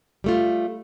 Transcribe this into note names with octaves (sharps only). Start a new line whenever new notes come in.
G3 A3 F4